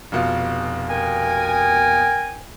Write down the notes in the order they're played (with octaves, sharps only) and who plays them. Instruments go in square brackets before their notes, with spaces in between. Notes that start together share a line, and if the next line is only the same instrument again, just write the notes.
[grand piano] F1 B2 F4
[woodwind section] A#4 G5 G#5